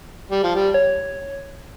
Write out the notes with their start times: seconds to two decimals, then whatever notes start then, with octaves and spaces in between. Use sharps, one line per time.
0.31 G3
0.43 F3
0.55 G3
0.74 C#5